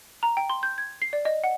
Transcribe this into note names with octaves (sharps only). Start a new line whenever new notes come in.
A#5
G5
C6
G6
G#6
C7
D5
D#5
F#5